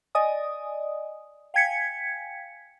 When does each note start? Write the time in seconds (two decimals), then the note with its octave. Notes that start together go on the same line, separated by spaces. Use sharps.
0.15 D5 D#5 G#5 D#6
1.54 F5 G5 G#5 G#6 B6 C#7